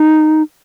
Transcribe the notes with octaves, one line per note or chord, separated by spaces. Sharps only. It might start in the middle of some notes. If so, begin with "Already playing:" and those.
Already playing: D#4